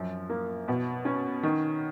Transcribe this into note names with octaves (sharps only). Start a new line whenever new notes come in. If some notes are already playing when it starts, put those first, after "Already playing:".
Already playing: F#2 F3
A#3
B2
C#4
D#3